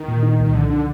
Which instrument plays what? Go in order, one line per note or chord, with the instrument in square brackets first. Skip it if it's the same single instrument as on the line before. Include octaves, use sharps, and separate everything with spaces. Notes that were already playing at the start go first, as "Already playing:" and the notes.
Already playing: [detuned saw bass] D#3
[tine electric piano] A#2
D#4
C2
[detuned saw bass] D#3
[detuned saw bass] D3 [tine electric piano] F3
[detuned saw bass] D3 [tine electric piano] D4